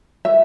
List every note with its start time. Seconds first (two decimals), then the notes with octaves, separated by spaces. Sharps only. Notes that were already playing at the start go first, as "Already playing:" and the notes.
0.25 E5